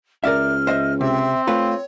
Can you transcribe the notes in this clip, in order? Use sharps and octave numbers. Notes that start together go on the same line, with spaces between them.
C#2 A#4 D5 E5 F6
C5 D#5 E5
C3 C4 E5
A3 F4 B4 C#5